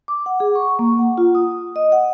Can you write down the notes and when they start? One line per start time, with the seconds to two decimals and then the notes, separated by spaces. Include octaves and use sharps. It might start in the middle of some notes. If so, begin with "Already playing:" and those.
0.08 D6
0.26 F#5
0.40 G#4
0.56 C#6
0.79 A#3
0.99 F#5
1.18 F4
1.35 D#6
1.76 D#5
1.92 F#5